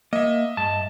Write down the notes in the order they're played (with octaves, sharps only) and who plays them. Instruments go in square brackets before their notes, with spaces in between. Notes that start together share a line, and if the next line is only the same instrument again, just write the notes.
[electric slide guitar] A#3 [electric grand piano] D#5 E5
[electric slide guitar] G2 A5